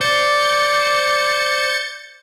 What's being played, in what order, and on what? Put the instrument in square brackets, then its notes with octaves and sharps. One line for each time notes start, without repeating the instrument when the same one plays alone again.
[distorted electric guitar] C5 [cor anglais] D5 [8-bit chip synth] G6 A6 C#7